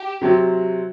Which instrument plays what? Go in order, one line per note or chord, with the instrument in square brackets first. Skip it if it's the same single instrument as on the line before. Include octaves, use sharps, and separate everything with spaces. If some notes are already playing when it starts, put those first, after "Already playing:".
Already playing: [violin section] G4
[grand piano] C3 F#3 C4